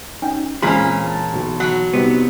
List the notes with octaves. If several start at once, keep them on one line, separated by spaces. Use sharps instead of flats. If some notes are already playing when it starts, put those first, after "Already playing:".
C#4 D#4 G5
A#2 E3 G#3 C4 C#4 F4 G#4 B5
A5
B1
F#3
C3 G3 B3 D#4